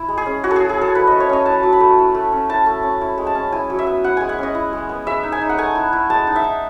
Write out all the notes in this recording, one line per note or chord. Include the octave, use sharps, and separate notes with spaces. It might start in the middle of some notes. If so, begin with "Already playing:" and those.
Already playing: E4
G#3
G#4
C#4
E4 F#4
A4
G#4
F#3
G#4
C#4 A4
E4 B4
A3 D#5
C#5
C#4 D#5
E4 A5
F#3
B5
A3
E4
A3
C#4
E4 A5
A3
C#4
E4
G#3
A5
C#4
E4 G#5
F#3
E5
B3
E4 F#5
G#3 G#5
F#5
C#4 D#5
E4
G#3
B3
G#3 E5
D#4
G#5
D#4
F#5
A3 G#5
E4
E4
G#3 A5
D#4
E5
D#4